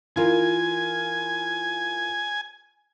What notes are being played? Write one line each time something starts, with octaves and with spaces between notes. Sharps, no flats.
E3 F4 A#4 G#5